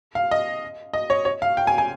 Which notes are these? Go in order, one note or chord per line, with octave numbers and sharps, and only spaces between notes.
F5
D#5
D#5
C#5
C#5
F5
G5
G#5
G#5